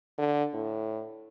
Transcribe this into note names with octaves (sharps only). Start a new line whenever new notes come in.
D3
A2